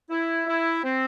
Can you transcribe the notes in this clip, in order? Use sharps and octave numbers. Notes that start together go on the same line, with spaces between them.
E4
E4
C4